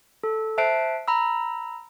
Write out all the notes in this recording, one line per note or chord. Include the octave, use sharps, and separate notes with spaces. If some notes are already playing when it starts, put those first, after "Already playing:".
A4
C5 E5 A5 F#6 C7 D7
A#5 B5 E6